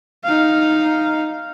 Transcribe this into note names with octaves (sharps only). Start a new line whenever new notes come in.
D#4 F5